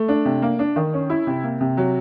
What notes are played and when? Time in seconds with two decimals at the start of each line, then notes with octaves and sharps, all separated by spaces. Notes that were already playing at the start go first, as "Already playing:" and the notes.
Already playing: A3
0.08 D4
0.25 C3
0.42 A#3
0.59 D4
0.76 D#3
0.93 C#4
1.10 E4
1.27 C3
1.43 A#3
1.61 C3
1.77 F#3